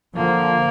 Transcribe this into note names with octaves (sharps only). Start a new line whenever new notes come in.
D3 F3 A#3